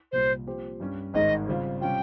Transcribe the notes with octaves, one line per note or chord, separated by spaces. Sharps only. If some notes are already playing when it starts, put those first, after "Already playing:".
C2 A#2 G3 C5
A#2 F3 C4 G4 C5
G2 G3 C#4
G#1 G#2 D#3 G#3 D#5
C#3 G3 C4 F4
C3 G3 C#4 F4 G5